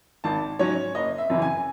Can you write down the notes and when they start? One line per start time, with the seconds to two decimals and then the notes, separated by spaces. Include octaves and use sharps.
0.24 G#1 A5
0.59 G#2 F#3 C#4 C#5
0.95 F#1 D#5
1.18 E5
1.30 F#2 C#3 E3
1.42 G#5